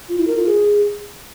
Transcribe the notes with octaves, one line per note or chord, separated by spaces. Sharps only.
F4
E4
A#4
F4
G#4